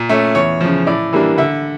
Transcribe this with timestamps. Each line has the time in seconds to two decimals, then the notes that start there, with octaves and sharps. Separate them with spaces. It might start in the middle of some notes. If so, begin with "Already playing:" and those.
Already playing: A#2
0.09 A3 C#4
0.35 E2 C#5
0.60 C#3 F3
0.87 A2 D5
1.13 E3 G3 A#3 D4
1.38 D3 E5